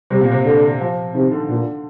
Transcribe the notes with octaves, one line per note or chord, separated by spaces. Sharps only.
C3 G3
A#2
C3
D3
F3
C3 D#3
D3
A#2 D3